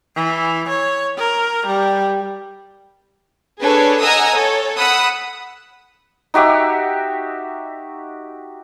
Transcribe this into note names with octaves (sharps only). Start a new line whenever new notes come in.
E3
C#5
A#4
G3
D4 G#4 A4 B4 C#5
D#5 F#5 G#5 A#5 D#6 E6
A4 C#5
F#5 B5 D#6 E6
D#4 F#4 G4 E5